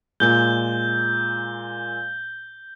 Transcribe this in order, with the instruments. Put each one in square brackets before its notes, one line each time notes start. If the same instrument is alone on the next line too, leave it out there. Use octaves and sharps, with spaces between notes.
[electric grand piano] A#2 G#3 [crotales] G6 G7